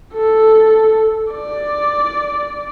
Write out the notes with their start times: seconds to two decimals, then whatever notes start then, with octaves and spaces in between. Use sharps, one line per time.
0.14 A4
1.33 D5